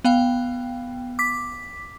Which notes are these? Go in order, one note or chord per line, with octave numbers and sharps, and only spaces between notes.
B3 F5 G5
D6 B6